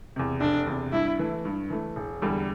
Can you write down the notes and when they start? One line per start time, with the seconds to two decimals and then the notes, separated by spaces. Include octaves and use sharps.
0.16 E2 C3
0.41 F1 D4
0.67 E2 C3
0.93 G2 E4
1.19 E3 A3
1.45 G2
1.70 E3 A3
1.96 E1
2.22 E2 D3 G3